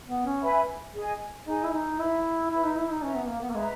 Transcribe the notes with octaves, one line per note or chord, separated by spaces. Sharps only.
B3
C#4
B4 E5 G#5 B5
G#4 D#5 G#5
D#4 G#4 D#5 G#5
E4
D#4
E4 B4 E5 B5
E4 B4 E5 B5
D#4
E4
D#4
C#4 B4 E5 A#5
B3
A#3
B3
A#3
G#3 B4 E5 A#5